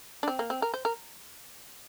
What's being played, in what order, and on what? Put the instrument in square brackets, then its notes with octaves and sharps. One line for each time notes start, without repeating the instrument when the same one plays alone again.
[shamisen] D4
C4
A#3
C4
A#4
C5
A#4